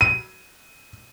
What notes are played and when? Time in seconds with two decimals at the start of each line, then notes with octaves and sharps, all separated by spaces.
0.01 D#7